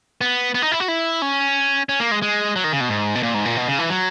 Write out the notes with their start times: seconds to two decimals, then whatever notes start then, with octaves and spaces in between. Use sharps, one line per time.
0.21 B3
0.55 B3
0.63 D#4
0.71 E4
0.80 F#4
0.88 E4
1.22 C#4
1.89 C#4
2.00 A#3
2.11 G#3
2.22 G#3
2.56 F#3
2.64 D#3
2.73 C#3
2.81 B2
2.89 G#2
3.15 B2
3.23 A#2
3.34 G#2
3.45 A#2
3.57 B2
3.68 C#3
3.79 E3
3.90 F#3